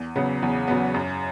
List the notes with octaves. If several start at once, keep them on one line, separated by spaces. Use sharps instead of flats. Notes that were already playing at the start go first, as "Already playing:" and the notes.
Already playing: E2
C#3 F#3 B3
E2
C#3 F#3 B3
F#2